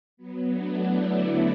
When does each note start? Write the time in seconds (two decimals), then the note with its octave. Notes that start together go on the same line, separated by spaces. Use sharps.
0.17 F#3 B3
0.47 A3 D4
0.77 B3 E4
1.06 D3 F#3